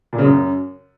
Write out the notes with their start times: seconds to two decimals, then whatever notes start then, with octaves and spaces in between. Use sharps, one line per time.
0.13 A#2
0.18 C#3
0.24 F#2